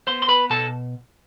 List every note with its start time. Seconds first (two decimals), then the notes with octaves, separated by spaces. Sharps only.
0.07 B3 C5 C6
0.22 C6
0.29 B4 B5
0.50 B2 A4 A5